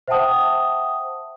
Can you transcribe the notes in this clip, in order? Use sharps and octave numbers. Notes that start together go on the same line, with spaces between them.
C5 E5 F#5 G5 A5 D#6